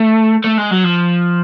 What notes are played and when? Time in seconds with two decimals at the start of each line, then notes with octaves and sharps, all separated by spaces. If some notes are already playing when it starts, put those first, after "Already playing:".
Already playing: A3
0.44 A3
0.58 G#3
0.71 F#3
0.84 F3